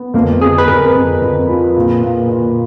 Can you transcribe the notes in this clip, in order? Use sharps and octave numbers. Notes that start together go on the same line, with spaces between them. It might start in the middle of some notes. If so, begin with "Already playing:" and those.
Already playing: B3
F2 A#3
F2 G#4
B4
F2 A#4
F2
F2
F3
A#2
A#2
A#2